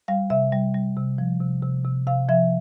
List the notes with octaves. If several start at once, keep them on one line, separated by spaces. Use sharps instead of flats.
G3 F5
C3 E5
G3
G3
C3
F3
C3
C3
C3
C3 F5
F3 E5